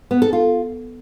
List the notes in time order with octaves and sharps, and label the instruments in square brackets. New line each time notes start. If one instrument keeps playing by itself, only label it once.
[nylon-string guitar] B3
A4
F4